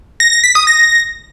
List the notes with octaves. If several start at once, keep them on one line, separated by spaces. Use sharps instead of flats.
A#6
A#6
B6
D#6
A#6